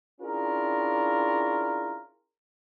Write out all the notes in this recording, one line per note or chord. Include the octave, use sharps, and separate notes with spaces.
C#4 D4 E4 F4 G#4 A#4